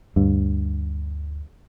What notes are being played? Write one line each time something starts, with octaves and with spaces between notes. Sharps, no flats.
D2 G2